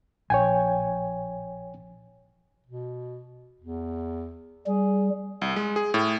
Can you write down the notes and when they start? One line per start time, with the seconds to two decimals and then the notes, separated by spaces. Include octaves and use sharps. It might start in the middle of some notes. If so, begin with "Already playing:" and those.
0.30 A#1 C#5 G5 G#5
2.67 B2
3.60 E2
4.66 G3 G#4
5.42 C2
5.56 G#3
5.76 G#4
5.94 A2